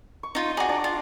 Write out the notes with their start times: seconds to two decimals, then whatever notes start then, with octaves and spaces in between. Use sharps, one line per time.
0.23 C#6
0.35 D#4 F4
0.57 F#4 G#4 D5 A#5
0.69 D4 D5
0.84 F4